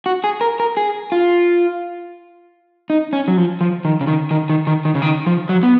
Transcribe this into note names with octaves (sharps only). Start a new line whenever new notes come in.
F#4
G#4
A#4
A#4
G#4
F4
D#4
C#4
F#3
F3
F3
D#3
C#3
D#3
D#3
D#3
D#3
D#3
C#3
D#3
F3
F#3
B3